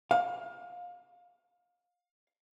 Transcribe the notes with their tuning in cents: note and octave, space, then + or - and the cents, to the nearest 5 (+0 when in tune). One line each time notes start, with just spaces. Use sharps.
F5 +25